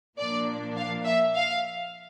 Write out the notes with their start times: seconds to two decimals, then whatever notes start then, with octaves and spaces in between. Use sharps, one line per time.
0.18 A#2 F3 A#3 D4 D5
0.77 F5
1.05 E5
1.35 F5